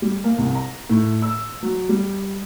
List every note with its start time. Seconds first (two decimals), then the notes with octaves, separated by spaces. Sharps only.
0.02 G3
0.24 A#3
0.38 C2
0.55 A#5
0.89 A2
1.22 E6
1.63 F#3
1.89 G3